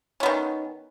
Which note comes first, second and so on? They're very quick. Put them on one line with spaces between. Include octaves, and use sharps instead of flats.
C#4 B3 D#3